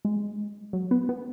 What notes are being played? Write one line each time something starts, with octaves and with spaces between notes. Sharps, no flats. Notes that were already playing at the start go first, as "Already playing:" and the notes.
G#3
F#3
B3
B3